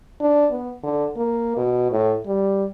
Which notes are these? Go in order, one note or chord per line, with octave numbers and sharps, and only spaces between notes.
D4
B3
D3
A#3
B2
A2
G3